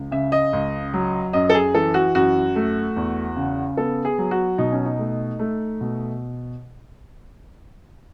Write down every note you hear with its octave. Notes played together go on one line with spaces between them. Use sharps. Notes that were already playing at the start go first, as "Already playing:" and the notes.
Already playing: C#2
C#3 E5
D#5
C#2
F#3
F#2 D#5
A4
G#4
E3 A4
F#4
F#2 F#4
A3
E2
C#3
B3 A4
G#4
F#3
F#4
B2 D#4
C#4
D#4
A3
A3
B2